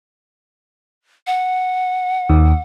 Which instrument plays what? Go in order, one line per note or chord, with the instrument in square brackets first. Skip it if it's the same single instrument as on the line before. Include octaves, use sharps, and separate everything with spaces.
[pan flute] F#5
[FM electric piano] D#2